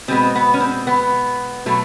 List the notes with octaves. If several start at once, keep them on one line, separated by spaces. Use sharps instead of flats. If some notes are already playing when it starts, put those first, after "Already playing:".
B2 G#3 B3 C4
B3
C#4
C4
B3
B2 F#3 A3